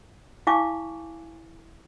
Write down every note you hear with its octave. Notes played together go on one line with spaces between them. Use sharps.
E4 F5 G#5 A5 C#6 D6